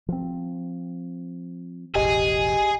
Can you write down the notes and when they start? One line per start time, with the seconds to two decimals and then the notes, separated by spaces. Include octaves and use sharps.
0.08 F3 C4
1.95 E1 A1 G4 G#4 D#5 G#5